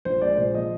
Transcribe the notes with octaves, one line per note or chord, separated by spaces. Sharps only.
A#1 C5
G#3 D5
A#2 C5
F3 D#5